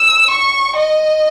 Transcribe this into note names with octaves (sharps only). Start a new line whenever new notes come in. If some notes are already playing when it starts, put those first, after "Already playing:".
Already playing: E6
C#6
D#5